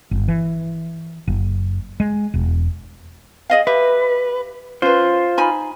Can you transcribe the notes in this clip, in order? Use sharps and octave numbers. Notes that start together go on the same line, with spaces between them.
G1
E3
F#1
G#3
E1
G#4 D#5 F5
G4 B4 E5
C#4 F4 B4 C5
D#4 G#5 B5